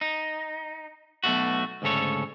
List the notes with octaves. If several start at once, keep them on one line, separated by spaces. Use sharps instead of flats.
D#4
B1 B2 A3 F#4
D2 G#2 C#3 A4 C#5